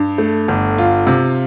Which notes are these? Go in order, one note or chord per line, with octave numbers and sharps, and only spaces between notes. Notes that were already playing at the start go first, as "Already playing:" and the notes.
Already playing: G2
A3
G1
F4
C3